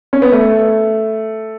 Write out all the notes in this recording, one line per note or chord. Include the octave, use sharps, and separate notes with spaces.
C#4
B3
A3